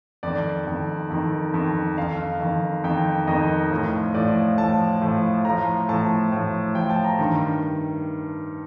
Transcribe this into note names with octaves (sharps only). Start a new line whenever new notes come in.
F2 D#3 D5
F2 D#3
F2 D#3
F2 D#3
F2 D#3 F5
F2 D#3
F2 D#3 G5
F2 D#3 D#5
A2 F3
A2 F3 D5
A2 F3 A5
A2 F3
A2 F3 A#5
A2 F3 A5
A2 F3
A2 F3 G5
A5
A#5
G2 D#3